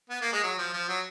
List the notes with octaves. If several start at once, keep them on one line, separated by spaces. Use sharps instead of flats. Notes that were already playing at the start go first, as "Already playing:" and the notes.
B3
A#3
G#3
F#3
F3
F3
F#3